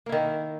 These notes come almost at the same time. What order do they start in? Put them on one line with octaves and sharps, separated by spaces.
A#3 E4 D#3